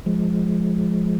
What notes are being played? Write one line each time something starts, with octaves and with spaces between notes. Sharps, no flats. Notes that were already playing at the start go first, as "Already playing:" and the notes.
F3 G#3